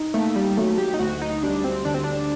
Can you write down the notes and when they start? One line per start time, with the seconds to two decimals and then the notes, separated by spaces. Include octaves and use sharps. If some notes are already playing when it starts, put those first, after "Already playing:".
Already playing: D#4
0.14 A3 A#3
0.36 G3
0.57 F#3 A3
0.78 G4
0.94 D#4
0.99 D2 F#4
1.22 D#4
1.43 G3 D4
1.64 C4
1.85 D3 D4
1.94 C4
2.04 D4